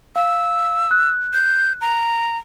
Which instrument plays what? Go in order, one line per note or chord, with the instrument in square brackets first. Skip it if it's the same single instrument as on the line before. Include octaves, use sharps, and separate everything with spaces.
[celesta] F5 [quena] E6
[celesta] F#6
[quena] G6
A#5